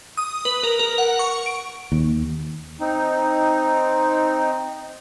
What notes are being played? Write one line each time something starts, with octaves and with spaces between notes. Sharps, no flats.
D#6
B4
A#4
A#4
F#5
C#6
D7
D#2
C4 D#4